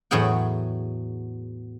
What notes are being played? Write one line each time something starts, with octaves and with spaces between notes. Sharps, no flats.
E2 A2 F#3 G#4 F#5 G5